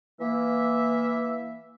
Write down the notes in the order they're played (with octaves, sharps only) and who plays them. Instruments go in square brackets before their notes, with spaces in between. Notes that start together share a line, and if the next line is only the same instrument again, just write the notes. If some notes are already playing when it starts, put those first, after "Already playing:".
[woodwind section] E3 A#3 E5